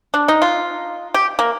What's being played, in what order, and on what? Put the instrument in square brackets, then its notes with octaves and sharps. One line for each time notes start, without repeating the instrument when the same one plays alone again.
[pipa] D4
D#4
F4
G4
A#3